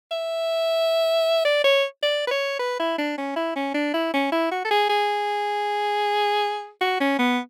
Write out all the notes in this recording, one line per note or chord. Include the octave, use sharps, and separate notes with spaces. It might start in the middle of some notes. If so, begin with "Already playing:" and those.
E5
D5
C#5
D5
B4
C#5
B4
E4
D4
C#4
E4
C#4
D4
E4
C#4
E4
F#4
A4
G#4
G#4
F#4
C#4
B3